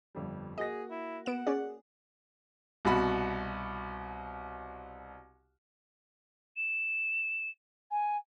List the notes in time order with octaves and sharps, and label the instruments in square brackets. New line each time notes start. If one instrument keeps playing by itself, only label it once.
[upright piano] G1 F2 G3
[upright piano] A#3 F#4 A#6 [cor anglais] G#4 [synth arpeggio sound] D#5
[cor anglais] E4
[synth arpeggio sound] B3 D7 E7 [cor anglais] F#5
[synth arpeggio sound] C#4 D5 [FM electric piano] G#4
[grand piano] C2 B2 F#4 B5
[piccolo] E7
G#5